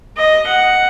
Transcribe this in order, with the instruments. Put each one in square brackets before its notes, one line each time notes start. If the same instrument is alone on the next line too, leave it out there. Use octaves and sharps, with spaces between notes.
[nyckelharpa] D#5
F#5